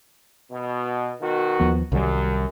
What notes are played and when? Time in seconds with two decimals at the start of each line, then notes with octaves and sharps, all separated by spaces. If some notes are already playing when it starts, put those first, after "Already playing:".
0.51 B2
1.21 B2 D#3 F#4
1.60 D#2 F3 B3
1.92 C2 F#2 D#3 G3